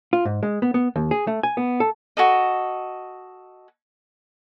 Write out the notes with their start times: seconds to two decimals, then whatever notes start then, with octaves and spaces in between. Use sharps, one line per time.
0.13 F4
0.25 G#2
0.43 G#3
0.62 B3
0.74 B3
0.96 D#2
1.11 G#4
1.27 A3
1.43 G#5
1.57 B3
1.80 A4
2.17 F#4 A4 D#5